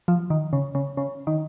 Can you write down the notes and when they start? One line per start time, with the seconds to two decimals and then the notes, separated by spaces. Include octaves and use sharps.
0.08 F3
0.30 D#3
0.53 C#3
0.75 C#3
0.97 C#3
1.27 D#3